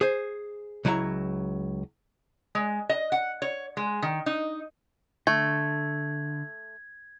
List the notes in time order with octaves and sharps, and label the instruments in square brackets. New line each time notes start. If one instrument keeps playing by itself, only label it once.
[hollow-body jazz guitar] G#4 C5
C#2 F#3 E4 F#5 A#5
[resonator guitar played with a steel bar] G#3
D#5
F#5
C#5
G#3
D#3
D#4
[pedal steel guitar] D3 [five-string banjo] A3 [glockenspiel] G#6